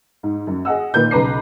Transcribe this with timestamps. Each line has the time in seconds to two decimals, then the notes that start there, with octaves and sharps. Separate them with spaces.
0.23 G#2
0.47 F#2
0.65 G#4 D#5 F#5 E6
0.94 A#2 D#3 B4 G6
1.11 B1 C#3 B4 A#5 D6 C7